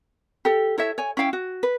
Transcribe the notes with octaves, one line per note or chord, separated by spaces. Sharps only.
G4 A4
E4 A4 C#5 E5
C#5 G#5
C#4 E4 F5 G5
F#4
B4